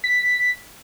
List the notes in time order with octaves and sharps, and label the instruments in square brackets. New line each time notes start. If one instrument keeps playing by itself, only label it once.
[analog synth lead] B6